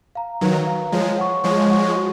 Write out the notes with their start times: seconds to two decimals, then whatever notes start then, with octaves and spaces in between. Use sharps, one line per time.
0.15 F5 A#5
0.41 D#3 F#3 B4
0.67 F5 A#5
0.92 F3 G#3 C#5
1.18 F#5 C#6
1.44 F3 G#3 C#5
1.70 F#5 C#6
1.96 F#4